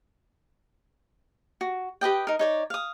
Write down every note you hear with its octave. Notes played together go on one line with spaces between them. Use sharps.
F#4
G4 B4 D#5 G5
D#4 A#4
D#4 C#5 D5
F5 D#6